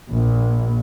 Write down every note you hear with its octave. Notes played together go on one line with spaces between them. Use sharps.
A#1